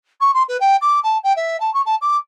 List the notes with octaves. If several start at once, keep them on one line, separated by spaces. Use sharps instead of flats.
C#6
C6
B4
G5
D6
A5
G5
E5
A5
C#6
A5
D6